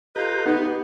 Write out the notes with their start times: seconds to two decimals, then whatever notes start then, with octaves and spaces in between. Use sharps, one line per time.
0.16 F4 G4 A4 B4 D#5 A#5 G6
0.46 B3 D#4 G4 B4